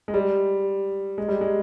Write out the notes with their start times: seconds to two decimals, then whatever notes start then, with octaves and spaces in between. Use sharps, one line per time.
0.08 G#3
0.14 G3
1.18 G#3
1.29 G3
1.41 G#3